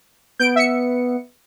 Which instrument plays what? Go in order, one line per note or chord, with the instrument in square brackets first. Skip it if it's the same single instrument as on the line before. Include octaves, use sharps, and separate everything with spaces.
[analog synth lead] B3 [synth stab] G6 D7
[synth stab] E5 C#7